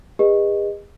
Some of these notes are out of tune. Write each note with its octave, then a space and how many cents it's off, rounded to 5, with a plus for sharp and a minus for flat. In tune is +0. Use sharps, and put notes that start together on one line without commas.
G#4 -40 B4 -20 D#5 -10